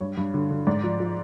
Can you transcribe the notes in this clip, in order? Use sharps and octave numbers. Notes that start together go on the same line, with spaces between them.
G2 C#5
G2
D3
D3
G#2 D5
F3
F3